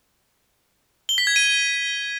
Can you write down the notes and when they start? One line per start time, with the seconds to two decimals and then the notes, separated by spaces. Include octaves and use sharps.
1.09 G7
1.18 B6
1.27 G#6
1.36 D#7